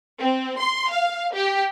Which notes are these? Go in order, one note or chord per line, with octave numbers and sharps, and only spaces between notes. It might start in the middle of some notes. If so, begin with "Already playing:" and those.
C4
C6
F5
G4